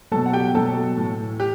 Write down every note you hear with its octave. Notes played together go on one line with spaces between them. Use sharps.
B2 F#3 A4 A5
F#5
G4 G5
B2 F#3 A4 A5
A2 E3
G4